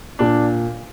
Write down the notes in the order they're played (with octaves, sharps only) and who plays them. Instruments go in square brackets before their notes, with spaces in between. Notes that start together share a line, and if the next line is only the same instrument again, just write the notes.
[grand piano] A#2 [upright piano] D4